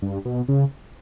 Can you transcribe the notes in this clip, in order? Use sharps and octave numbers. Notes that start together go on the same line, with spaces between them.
G2
B2
C#3